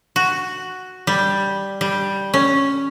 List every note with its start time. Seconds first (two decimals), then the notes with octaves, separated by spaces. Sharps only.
0.16 F#4
1.07 G3
1.81 G3
2.34 C#4